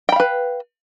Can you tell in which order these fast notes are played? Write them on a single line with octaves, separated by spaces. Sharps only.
G5 B5 F5 B4